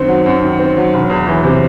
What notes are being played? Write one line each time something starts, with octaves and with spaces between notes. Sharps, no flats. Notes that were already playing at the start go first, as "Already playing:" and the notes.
Already playing: F#2 D#3 C4
F#3
F#2
D#3
C4
F#3
E1
E2
E3
C3